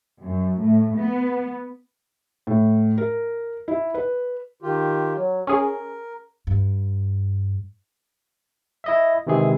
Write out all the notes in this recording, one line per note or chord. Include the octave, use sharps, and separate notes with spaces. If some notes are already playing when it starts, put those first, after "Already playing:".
F#2
A2
B3
A2
A#4
E4
B4
D#3 F4 G4
F#3
C#4 G#4 A#4
G2
E4 D#5 E5
C3 D#3 E3 G#3 G#4